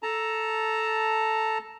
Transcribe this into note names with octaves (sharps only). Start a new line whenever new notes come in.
A4 A5 A#5